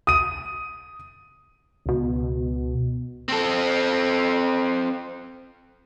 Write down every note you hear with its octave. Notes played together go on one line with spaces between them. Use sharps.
D#6 D#7
C#2 B2
C4 A4